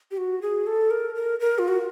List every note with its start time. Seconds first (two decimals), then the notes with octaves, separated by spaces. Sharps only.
0.11 G4
0.17 F#4
0.42 G#4
0.67 A4
0.90 A#4
1.15 A#4
1.40 A#4
1.59 F4
1.68 F#4